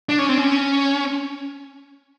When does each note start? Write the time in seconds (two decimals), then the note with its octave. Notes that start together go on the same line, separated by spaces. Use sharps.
0.09 D4
0.19 C#4
0.29 C4
0.38 C#4